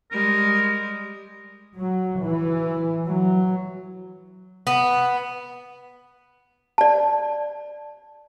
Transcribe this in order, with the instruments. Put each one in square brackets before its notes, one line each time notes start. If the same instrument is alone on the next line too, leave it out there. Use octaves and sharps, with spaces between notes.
[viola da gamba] G3 G#3 [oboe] A#4
[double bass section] F#3
E3
F#3
[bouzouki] B3
[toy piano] D5 A5